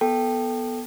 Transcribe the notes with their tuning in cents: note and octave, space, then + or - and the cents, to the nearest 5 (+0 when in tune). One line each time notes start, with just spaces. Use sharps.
B3 -10 A4 +0 G5 +0